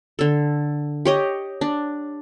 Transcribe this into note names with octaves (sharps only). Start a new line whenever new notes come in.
D3 A4
G4 C#5 D#5
D4